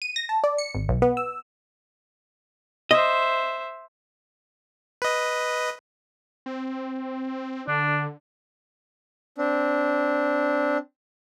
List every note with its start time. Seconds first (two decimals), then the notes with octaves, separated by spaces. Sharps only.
0.02 D#7
0.16 A#6
0.29 A5
0.44 D5
0.58 C#7
0.75 G#1
0.89 B1
1.02 B3
1.17 E6
2.91 C5 D#5 E5
5.02 B4 D#5
6.46 C4
7.68 D3 D4
9.38 C4 D4